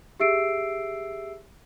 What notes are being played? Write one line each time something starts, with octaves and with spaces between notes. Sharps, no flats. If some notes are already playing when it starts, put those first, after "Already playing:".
G4 G#4 E5 E6 C7 D7